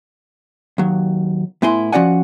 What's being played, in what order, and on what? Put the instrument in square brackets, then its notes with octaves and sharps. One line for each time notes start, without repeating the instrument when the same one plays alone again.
[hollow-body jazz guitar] D#2 F#3
A2 B3 E4 G#5 C6
F3 C#4 F#4 D5 F#5 G#5